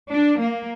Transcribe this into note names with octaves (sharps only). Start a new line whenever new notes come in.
D4
A#3